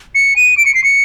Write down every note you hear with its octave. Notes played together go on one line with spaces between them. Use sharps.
C#7
D#7
D7
C#7
C7
C#7